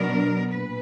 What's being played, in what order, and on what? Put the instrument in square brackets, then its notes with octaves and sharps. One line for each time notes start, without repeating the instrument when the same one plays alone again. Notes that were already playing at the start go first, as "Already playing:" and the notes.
Already playing: [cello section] B2 F#3 B3 D4 A#4
A#2 B4